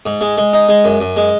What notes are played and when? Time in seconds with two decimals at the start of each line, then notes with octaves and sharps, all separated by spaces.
0.06 G#2
0.21 G#3
0.38 G#3
0.53 D#4
0.68 G#3
0.84 F#2
1.00 F#2
1.17 G#3